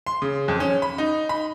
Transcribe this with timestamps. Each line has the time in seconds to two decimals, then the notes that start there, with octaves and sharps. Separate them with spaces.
0.07 C6
0.22 C#3
0.48 F2
0.60 C#4
0.82 B5
0.98 D#4
1.29 B5